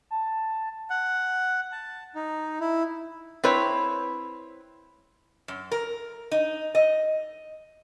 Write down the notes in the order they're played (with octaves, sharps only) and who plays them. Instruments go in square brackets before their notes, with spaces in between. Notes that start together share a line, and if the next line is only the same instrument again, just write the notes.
[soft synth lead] A5
[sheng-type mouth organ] F#5
A5
D#4
E4
[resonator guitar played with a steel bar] C4 E4 B4 C#5
F#2
A#4
D#4
D#5